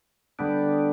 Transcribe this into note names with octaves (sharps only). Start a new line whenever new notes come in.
D3 G3 B3 D4